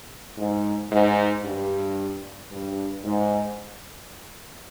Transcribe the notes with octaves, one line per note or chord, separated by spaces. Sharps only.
G#2
G#2
G2
G2
G#2